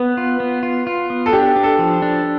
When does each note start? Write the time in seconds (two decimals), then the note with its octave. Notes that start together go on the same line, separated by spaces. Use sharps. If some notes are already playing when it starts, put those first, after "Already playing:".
Already playing: B3 B4
0.17 F4
0.40 B3
0.63 F4
0.87 F4
1.10 B3
1.26 A4
1.33 D4 G4
1.56 D4
1.63 A4
1.79 F3
2.02 D4